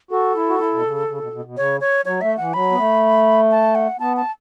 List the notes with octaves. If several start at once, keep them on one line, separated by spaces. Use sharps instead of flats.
F#4 A4
E4
F#4
E4
B2
C#3
C#3
B2
B2
B2
C#3 C#5
C#5
F#3 C#5
A3 E5
E3 F#5
F#3 B5
B3
A3
A5
F#5
B3 A5
A5